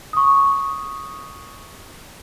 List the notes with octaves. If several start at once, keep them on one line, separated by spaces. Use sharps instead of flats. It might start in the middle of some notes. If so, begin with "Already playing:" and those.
C#6 D#6